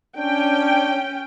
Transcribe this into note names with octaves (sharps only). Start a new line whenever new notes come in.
C#4 D4 G5